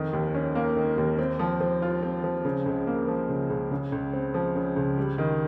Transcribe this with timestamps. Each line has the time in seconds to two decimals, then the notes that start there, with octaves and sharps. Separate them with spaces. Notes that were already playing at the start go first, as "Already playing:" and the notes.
Already playing: F2 D#3
0.13 D#2
0.34 C#4
0.55 A#3
0.76 D#3
0.98 D#2
1.19 C4
1.39 F3
1.61 F3
1.82 F4
2.03 C4
2.24 F3
2.45 C#3
2.66 C#2
2.87 A#3
3.08 F3
3.29 C#3
3.50 C#2
3.71 C#3
3.92 C#2
4.13 C4
4.34 F3
4.55 C#3
4.76 C#2
4.98 G3
5.18 D#3